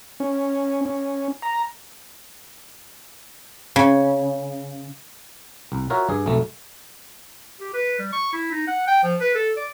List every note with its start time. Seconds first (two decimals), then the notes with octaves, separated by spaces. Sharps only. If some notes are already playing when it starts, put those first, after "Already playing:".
0.20 C#4
0.86 C#4
1.42 A#5
3.76 C#3
5.72 C2
5.90 F4 F#4 A#4 C#5 E5
6.09 G2 G#4
6.26 B1 F2 A3
7.60 G4
7.74 B4
7.99 G3
8.12 C#6
8.33 E4
8.52 D#4
8.68 F#5
8.87 G5
9.04 F3
9.21 B4
9.35 A4
9.57 D5